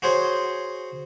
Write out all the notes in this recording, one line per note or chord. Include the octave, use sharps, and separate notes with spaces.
F#4 G#4 C5 C#5 F#5 C6